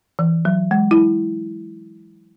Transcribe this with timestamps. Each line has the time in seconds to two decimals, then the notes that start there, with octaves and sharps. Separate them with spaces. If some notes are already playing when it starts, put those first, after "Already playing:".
0.19 E3
0.45 F#3
0.71 G#3
0.91 E4